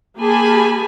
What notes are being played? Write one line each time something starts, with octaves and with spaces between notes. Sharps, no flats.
A#3 G4 G#4 G#5 A5 B5